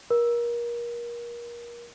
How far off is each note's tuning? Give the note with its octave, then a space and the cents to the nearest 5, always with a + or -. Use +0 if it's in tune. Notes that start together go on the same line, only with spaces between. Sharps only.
A#4 +30